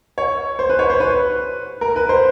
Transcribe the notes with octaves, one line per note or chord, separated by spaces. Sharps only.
C#5
C5
B4
C#5
C5
B4
A#4
B4
C5